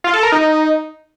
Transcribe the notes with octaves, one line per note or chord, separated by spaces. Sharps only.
F4
A4
A#4
D#4